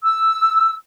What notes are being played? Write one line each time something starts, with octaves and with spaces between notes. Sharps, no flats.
E6